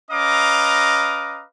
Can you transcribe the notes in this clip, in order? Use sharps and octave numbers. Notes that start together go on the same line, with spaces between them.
C#4 B4 D#5 F5 A#5 D6